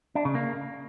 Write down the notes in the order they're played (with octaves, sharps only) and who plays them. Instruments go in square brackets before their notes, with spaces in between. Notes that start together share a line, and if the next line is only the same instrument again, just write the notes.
[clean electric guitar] D4
C#3
A#3